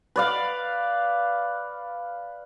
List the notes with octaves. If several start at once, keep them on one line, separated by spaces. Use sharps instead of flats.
B4 D5 F5